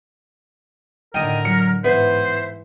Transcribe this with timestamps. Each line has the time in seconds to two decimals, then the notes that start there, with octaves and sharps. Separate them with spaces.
1.14 A2 D3 D#3 A#4 G5 D#6
1.45 F#3 C#7
1.84 G#2 E3 B3 C5 E5